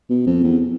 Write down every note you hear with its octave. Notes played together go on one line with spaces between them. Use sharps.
B2
F2
E2